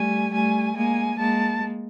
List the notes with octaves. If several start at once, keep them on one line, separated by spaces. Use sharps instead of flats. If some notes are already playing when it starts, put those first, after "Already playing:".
Already playing: G3 A3 G#5
G3 A3 G#5
G#3 A#3 G#5
G#3 A#3 A5